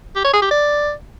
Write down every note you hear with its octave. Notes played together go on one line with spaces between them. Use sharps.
G4
C#5
G#4
G4
D5